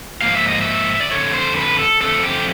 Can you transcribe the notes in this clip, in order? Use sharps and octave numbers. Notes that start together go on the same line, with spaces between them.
G#2 F3 A#3 F5
E5
D#5
E5
D5
F2 D3 F3 A3 C#5
C5
B4
A4
F2 D3 F3 A3 A4
G4